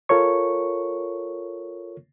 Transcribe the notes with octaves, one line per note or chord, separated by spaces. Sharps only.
F4 A4 A#4 C#5 C#6